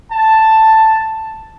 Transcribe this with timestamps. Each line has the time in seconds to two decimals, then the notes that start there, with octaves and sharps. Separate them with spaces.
0.11 A5